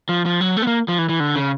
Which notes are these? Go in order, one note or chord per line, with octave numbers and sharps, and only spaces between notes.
F3
F3
F#3
A3
B3
A#3
F3
E3
E3
D3
C#3